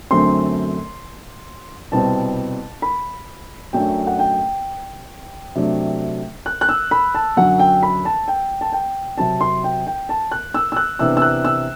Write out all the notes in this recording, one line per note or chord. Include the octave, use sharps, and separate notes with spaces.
F#2 D3 F#3 A3 C4 C6
C2 B2 G3 C4 A5
B5
F#2 F#3 A3 D4 G5
F#5
G5
C3 F#3 A3 D4
F#6
F#6
E6
B5
A5
F#2 D3 F#3 F#5
G5
B5
A5
G5
A5
G5
C3 F#3 C4 A5
C6
G5
G5
A5
F#6
E6
E6
F#6
C3 E3 B3 D4 E6
E6
F#6
E6